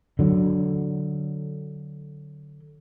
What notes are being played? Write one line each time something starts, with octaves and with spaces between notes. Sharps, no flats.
D3 F#3